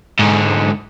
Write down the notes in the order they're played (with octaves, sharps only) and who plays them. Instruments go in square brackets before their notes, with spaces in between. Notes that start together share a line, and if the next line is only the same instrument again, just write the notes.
[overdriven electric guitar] G#2 D3